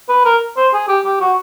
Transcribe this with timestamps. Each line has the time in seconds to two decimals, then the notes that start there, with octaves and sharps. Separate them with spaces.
0.09 B4
0.25 A#4
0.57 C5
0.73 G#4
0.88 G4
1.05 G4
1.20 F#4